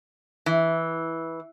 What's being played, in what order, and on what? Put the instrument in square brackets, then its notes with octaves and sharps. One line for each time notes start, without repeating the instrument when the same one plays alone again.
[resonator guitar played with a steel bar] E3